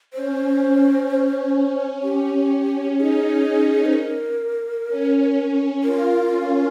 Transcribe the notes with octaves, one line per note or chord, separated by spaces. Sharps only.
C#4 C5
C#4 G4
C#4
D#4 G#4
C5
A#4
C#4
F4 A#4
C#4